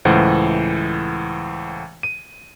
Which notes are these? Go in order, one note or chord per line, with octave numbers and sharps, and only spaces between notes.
C#2 A2 E3 C5 F#5
D#7